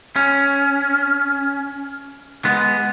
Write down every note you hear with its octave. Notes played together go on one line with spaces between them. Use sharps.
C#4
G#3 B3